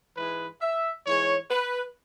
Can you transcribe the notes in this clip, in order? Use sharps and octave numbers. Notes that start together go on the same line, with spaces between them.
G#2 E3 G#3 B4
E5
G#2 E3 G#3 C#5
B4